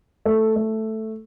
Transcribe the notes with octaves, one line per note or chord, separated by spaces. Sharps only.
A3
A3